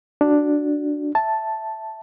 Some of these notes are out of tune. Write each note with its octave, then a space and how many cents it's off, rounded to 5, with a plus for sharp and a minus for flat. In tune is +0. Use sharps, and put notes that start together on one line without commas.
D4 +0 F#4 +0
E5 +0 A5 +0